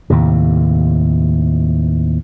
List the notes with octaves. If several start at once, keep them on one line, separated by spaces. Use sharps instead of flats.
D#2 A2 C3